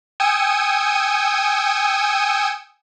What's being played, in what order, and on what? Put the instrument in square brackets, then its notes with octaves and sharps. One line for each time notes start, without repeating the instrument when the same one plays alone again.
[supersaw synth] G5 G#5 D#6 E6 C#7 D#7